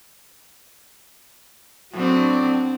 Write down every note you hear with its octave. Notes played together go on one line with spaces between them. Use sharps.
A2 F#3 C4 D4